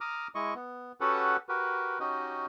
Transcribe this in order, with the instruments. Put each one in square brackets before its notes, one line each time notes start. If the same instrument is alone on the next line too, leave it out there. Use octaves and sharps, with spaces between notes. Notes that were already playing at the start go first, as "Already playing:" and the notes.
[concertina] A#5 D6 D#6 F6
G#3 E4 D#5 C#6
B3
C#4 F#4 G4 A4 B4 F#5
F#4 G4 A#4 B4
C#4 D#4 F#4 G4 D#5